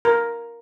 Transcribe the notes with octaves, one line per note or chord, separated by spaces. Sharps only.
A#4